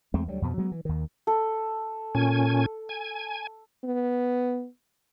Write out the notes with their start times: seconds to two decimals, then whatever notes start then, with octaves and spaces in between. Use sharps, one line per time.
0.14 E2 G#3 A3 C4
0.28 D2 F#3 G3
0.42 F2 B2 F3
0.58 F#3 G#3 B3
0.72 E3
0.85 D#2 D#3
1.27 A4
2.15 A#2 C#4 G#5
2.89 G#5
3.85 B3